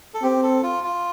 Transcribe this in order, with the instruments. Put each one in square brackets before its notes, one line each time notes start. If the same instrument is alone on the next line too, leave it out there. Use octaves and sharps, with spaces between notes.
[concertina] A4
[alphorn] C4 [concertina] G4
[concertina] A4
F4
F4